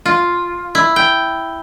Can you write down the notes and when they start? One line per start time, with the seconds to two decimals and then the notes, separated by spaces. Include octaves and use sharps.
0.06 F4
0.75 E4
0.96 G5